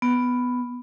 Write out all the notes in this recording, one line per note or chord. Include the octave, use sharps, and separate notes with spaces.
B3